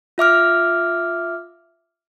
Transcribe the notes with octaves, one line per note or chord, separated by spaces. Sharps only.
F4 E5 D6 F6